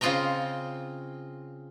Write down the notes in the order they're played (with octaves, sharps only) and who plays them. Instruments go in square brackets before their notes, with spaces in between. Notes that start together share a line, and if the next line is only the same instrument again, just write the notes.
[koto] C#3 C4 F4 D#5 G5 A#5